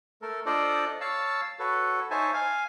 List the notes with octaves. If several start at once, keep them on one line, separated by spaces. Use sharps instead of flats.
A3 A4 A#4
D4 F4 A4 C5 D5 D#5
C#5 F5 A5 E6
F#4 A4 B4 C#5
D#4 C5 C#5 E5 G#5 A5
F5 G#5